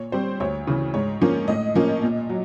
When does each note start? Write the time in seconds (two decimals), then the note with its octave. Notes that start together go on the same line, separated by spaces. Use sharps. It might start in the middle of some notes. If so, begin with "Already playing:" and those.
Already playing: A#2 C#5
0.12 G3 C4 C5
0.40 D2 C#5
0.67 C#3 E3
0.94 G#2 C#5
1.21 F3 A#3 C#4
1.48 A2 D#5
1.75 F3 A#3 C#4
2.03 A#2
2.30 F#3